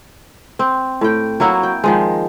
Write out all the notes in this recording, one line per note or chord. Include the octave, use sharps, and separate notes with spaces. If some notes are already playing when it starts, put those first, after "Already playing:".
C4
A2 G5
F#3 A#3 E4 F#4
G5
D#3 F3 G#3